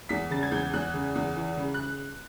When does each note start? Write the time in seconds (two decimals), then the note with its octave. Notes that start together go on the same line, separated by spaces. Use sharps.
0.09 E2 B6
0.30 C#3 A6
0.43 G#6
0.52 E2 G6
0.73 E2 F#6
0.94 C#3
1.15 E2
1.36 E3
1.57 C#3
1.74 F#6